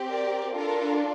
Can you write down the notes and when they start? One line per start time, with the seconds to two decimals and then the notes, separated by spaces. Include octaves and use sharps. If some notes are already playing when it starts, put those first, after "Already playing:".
Already playing: C4 G4
0.09 A#4 D5
0.55 D4 F4 A4 A#4